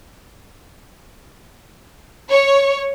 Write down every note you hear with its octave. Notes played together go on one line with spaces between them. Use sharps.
C#5